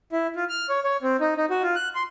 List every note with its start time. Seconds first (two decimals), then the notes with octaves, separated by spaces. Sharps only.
0.12 E4
0.36 F4
0.49 F6
0.69 C#5
0.84 C#5
1.02 C4
1.21 D#4
1.37 D#4
1.50 F#4
1.63 F4
1.75 F#6
1.95 C6